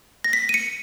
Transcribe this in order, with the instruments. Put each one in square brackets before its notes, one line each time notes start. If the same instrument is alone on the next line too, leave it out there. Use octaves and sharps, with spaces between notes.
[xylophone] A#6
B6
D#7
C#7